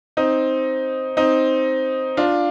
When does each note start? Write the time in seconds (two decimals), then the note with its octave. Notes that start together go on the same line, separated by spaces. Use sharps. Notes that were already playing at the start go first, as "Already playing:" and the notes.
0.17 C4 D#4
1.17 C4 D#4
2.17 D4 F4